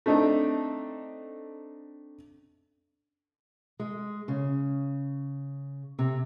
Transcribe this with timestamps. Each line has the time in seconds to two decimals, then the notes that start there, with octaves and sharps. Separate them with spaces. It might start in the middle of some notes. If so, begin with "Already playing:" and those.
0.06 A3 C4 D4 D#4 A4
3.80 G#3
4.28 C#3
5.99 C3